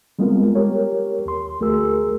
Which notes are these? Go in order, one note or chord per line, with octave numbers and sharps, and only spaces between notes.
G3 G#3 B3 C4 F4 A#4
G4 A#4 C#5
D#2 C6
D2 A3 F#4 G#4 A#4 E6